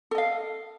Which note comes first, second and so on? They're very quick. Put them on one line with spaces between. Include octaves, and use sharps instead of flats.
A4 D#5 F5